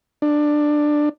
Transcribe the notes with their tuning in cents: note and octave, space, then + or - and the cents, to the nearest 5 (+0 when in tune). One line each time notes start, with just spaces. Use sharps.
D4 +15